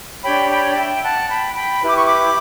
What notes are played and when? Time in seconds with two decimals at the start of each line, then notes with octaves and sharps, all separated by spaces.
0.23 D4 G4 C#5 G5 B5
0.50 G5 B5
0.76 E5 G5
1.02 F#5 A5
1.28 G5 B5
1.54 G5 B5
1.81 E4 G4 B4
1.89 D6
1.97 C#6
2.05 B5 D6